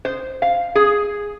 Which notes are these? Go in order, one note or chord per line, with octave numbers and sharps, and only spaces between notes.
C5
F5
G#4